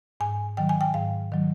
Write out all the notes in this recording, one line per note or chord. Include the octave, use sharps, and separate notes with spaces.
G#2 G#5
D#3 F#3 G5
G#5
G5
G#2 F5
D#3 F#3